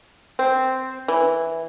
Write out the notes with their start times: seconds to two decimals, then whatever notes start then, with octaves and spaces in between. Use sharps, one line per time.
0.39 C4
1.08 E3